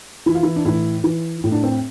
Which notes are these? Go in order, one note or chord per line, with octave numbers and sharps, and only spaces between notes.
E3 E4
F4
E3 E4
D4
A2 E3 E4
E3
A2
D4
C4